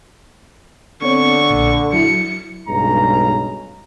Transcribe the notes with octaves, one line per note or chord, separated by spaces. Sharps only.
D3 B3 C4 C#5 C#6
A#1 A#2
F#3 E4 C#7
B1 G2 C#3 G#3 A#5